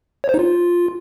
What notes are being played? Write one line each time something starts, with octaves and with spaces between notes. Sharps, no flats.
C#5
C5
D#4
F4